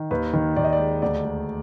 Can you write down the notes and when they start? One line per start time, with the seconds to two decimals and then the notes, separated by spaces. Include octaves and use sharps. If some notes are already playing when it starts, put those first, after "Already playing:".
Already playing: D#3
0.11 D#2 B4
0.33 D#3
0.56 D#2 D5
0.64 D#5
0.73 D5
0.79 G#3
1.02 D2 D5
1.25 G#3